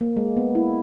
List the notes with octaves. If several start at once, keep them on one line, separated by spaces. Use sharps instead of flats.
A#3
G#3
B3
E4